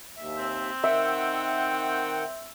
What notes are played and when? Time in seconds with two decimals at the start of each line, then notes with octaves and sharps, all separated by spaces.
0.17 D#2 E5
0.38 C4
0.84 D#3 E5 F#5 G5